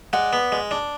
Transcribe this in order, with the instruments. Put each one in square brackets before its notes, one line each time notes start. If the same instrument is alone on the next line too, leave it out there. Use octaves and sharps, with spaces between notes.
[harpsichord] G#3 [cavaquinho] D5 F#5
[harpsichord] B3
G#3
D4